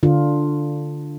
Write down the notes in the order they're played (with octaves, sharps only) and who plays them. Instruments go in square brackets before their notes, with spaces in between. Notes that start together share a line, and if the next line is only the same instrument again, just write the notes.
[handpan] D3 D4 F4